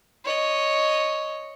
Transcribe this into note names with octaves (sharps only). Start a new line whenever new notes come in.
C#5 D#5